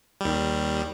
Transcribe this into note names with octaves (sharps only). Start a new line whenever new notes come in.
D#2 G3